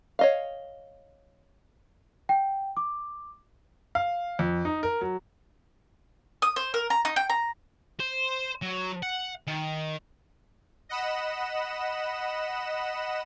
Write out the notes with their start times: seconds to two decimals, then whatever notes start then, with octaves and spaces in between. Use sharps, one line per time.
0.19 C#5 D#5 F5
2.29 G5
2.77 D6
3.95 F5
4.39 F2
4.65 D#4
4.83 A#4
5.01 F#3
6.42 D#6
6.56 C5
6.74 A#4
6.90 A#5
7.05 D#4
7.16 G5
7.29 A#5
8.00 C5
8.62 F#3
9.03 F#5
9.47 D#3
10.89 D#5 F#5 B5 E7